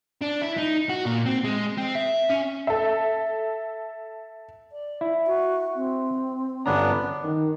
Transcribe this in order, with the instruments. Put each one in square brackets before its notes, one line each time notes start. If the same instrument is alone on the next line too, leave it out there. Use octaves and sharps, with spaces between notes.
[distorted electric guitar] D4
E4
D#4
F#4
A#2
C4
G#3
C4
E5
C#4
[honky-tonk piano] A4 E5
[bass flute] D5
[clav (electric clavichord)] E4
[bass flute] F#4
C4
[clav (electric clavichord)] G1 C#4 A#5 [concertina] B3 D4
[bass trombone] D#3